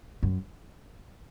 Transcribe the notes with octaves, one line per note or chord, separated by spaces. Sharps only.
F#2